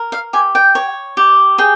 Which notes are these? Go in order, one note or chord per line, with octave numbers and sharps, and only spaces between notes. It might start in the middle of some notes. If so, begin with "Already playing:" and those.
Already playing: A#4
F5
G4 G#5
G5
C#5
G4
G#4 G5